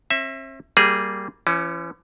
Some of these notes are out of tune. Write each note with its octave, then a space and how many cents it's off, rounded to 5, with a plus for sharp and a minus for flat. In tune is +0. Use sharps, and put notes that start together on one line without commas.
C4 +45 E5 +0
G3 -15 A#3 -15 G#4 +0
E3 +40 C#4 +0